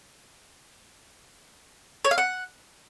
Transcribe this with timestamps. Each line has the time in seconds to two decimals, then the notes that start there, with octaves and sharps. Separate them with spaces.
2.05 C#5
2.11 F5
2.18 F#5